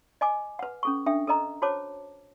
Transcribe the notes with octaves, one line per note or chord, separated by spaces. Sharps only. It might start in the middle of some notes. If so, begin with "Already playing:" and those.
D#5 G#5 D6
B4 F#5
C#4 A4 C#6
D4 A4 E5 G5
A4 A#4 D#5 A#5
F#4 C5 C#5 A5 D6